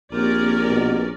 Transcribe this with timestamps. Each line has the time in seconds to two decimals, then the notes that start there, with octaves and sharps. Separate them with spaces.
0.12 A#1 A#3 C4 C#4 G4 A#4 D5
0.69 B2